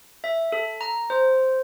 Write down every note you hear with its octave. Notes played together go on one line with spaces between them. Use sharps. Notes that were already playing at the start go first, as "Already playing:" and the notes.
E5
A4
A#5
C5